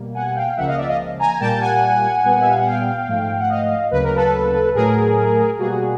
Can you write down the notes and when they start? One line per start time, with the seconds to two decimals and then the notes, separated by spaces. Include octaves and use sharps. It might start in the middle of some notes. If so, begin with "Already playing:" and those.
Already playing: B2 G3 A#3
0.14 F#5 G#5
0.35 F5 G5
0.56 C#2 C#3 F3 A#3 E5 F#5
0.67 D#5 F5
0.77 D5 E5
0.87 D#5 F5
1.19 G#5 A#5
1.40 A#2 G3 A#3 G5 A5
1.61 F#5 G#5
2.24 A#2 G3 B3
2.41 E5
2.49 F5
2.57 F#5
2.65 F5 G5
3.07 G#2 F3 A3
3.39 F#5
3.49 D#5 F5
3.91 D2 C#3 F#3 A#3 B4
4.04 A#4
4.16 A4 B4
4.75 A2 F#3 A3 G#4 A#4
5.59 B2 G3 A#3 F#4 G#4